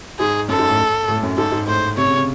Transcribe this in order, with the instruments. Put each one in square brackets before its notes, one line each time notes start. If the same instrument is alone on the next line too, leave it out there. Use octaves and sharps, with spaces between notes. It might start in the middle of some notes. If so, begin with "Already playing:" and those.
[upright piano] G#2 [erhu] G#4
[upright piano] F#2 [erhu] A4
[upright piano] G#2
A2
A2
F#2
[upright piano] G#2 [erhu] A4
[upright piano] G#2
[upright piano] A2 [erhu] C5
[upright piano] C3 [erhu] C#5
[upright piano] C#3
C#3